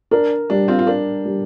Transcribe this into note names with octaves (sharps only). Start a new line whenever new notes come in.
D4 A#4
G3 D4
C4 F4
F4
D4 A#4
G3